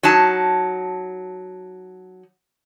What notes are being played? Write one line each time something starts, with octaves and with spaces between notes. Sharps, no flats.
F#3 D#4 A5